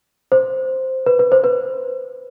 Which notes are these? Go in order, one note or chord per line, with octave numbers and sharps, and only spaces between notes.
C5
B4
B4
C5
B4